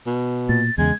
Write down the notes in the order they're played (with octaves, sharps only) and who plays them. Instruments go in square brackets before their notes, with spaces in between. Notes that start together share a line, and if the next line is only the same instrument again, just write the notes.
[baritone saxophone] B2
[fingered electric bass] A#2 [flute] A6
[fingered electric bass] E2 C#3 [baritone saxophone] G#3 [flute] G#6